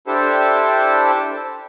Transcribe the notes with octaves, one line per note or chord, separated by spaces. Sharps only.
D4 E4 G4 A4 C5